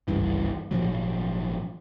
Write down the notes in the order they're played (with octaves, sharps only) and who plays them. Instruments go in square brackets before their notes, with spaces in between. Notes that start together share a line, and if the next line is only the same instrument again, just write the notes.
[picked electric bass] G#1 C#2 G2 E3
G#1 A#2 F3 F#3